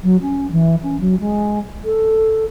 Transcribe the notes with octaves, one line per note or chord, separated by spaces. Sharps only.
F#3
C#4
E3
C#4
F#3
G#3
A4